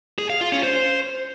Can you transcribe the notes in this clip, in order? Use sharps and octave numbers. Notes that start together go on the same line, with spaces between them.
G#4
F5
F4
C#4
C5